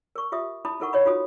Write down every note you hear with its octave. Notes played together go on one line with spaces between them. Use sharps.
A#4 C#6
F4 G4 E5 D#6
E4 A5 B5 D#6
D#4 E4 A4 A#4 F#5 C#6
E4 C#5 D#5 B5
D#4 F4 F#4 A4 D#6